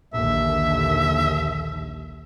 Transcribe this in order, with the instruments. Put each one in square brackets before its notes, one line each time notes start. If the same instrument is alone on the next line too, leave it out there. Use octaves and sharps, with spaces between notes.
[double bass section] A#1 D#2 D3 [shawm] E5